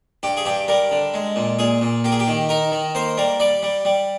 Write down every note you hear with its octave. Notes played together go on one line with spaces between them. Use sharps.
G2 G4
G#4
G2 G4
G3 A#4
D3
G#3
A#2
A#2 G#4
A#2
A#3 G4
G#4
G4
D#3
D#4 A#4
D#3
A#3 C5
G3 A#4
G3 D5
G3
G3